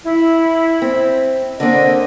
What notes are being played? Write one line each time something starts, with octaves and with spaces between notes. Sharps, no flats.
E4
C4
D3 A#3 C4 D4 D#5